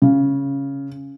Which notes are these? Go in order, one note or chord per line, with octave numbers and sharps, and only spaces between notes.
C#3